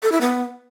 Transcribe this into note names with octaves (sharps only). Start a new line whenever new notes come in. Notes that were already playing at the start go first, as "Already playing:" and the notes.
A4
E4
B3